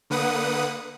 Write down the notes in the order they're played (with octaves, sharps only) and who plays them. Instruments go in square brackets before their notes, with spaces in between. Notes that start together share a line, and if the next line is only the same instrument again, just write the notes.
[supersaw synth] D3 A#3 B4 F#5 D#6